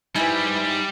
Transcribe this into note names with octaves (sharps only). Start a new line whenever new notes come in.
G3 D#4 E4 B4 C5 G#5